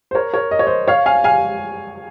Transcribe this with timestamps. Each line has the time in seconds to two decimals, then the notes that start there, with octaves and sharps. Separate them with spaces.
0.11 C5
0.15 A#4 C#5
0.34 A#4 C#5
0.51 D#5
0.59 C#5
0.66 C5 D#5
0.88 C#5 F5
1.06 F5 G#5
1.24 F5 G#5